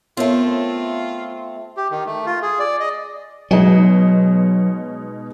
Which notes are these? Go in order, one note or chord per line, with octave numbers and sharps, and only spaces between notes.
A3 B3 C4 F4 A#4 C#5
G4
D#3
A3
F4
G#4
D5
D#5
B2 F#3 G#3 D#4